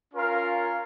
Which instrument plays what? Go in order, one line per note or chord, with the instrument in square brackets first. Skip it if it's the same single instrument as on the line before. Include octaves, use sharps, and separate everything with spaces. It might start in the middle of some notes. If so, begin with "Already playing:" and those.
[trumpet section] C#4 F4 A#4 F5